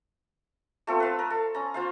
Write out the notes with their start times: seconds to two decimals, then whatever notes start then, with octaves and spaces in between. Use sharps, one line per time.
0.87 A3 C4 F4 A4
1.00 B4 F5
1.19 A#4
1.30 A4
1.55 C#4 A#5
1.74 F4 C5 F5